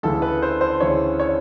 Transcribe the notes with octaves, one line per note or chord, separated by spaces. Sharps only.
D2 C#3 E3 A4
B4
C5
C5
D2 C#3 E3 C#5
C#5